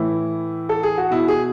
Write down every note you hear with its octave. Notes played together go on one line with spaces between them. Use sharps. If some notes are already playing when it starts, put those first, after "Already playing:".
Already playing: A2 E3 E4
A4
G#4
F#4
B2 E4
G#4